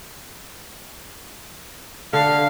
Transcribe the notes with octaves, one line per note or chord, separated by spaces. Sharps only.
D3 F5